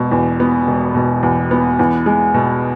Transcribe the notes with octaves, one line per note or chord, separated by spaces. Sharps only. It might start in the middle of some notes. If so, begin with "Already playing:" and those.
Already playing: E1 B2
E2
B3
E1
B2
E2
B3
E2
G#3
B2